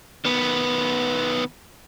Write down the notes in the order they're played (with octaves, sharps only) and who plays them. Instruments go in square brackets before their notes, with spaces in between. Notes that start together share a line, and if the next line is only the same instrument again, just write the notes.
[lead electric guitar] D#3 B3